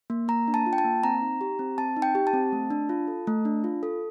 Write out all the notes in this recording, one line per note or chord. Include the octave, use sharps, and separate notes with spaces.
A#3
A#3 A#5
D4
A5
F4
G5
A5
A#3
C4 A#5
D#4
G4
C4
C4 A5
D#4
G5
G4
A5
C4
A3
D4
F4
A4
A3
D4
F4
A4